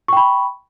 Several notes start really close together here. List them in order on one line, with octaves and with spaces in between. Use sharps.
C#6 G5 B5